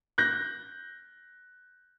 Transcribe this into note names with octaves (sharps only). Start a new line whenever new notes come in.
F#6 G6 A#6